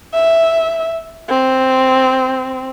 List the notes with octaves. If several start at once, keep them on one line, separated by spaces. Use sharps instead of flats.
E5
C4